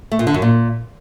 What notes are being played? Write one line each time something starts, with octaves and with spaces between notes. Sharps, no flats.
A3
A#2
D3
F#2
A#2